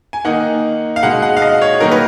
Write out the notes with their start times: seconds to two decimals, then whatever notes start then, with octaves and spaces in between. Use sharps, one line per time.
0.13 G#5
0.25 D#3 A#3 D#4 F#5
0.96 F5
1.03 B2 G#3 D#4 F#5
1.22 F#5
1.37 F5
1.42 D#5
1.62 C#5
1.80 D#3 F#3 A#3 D#4 A#4
1.91 B4